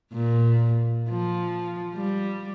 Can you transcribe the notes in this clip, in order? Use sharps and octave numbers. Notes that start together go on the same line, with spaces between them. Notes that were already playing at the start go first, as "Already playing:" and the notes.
A#2
F3
G3